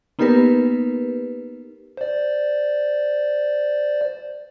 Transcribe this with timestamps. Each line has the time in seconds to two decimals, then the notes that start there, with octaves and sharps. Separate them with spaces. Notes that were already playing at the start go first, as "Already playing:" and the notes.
0.19 A#3 B3 D#4 G4 A#4 B4
1.97 C5 D5